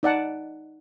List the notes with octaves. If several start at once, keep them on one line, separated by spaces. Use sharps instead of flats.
D#4 D5 F#5 A5